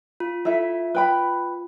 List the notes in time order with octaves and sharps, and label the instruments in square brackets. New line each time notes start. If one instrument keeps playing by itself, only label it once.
[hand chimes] F4
[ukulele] E4 A4 E5 [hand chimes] F4
[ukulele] B4 G5 B5